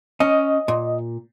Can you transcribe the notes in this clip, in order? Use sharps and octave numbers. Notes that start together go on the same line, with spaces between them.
C#4 D#5
A#2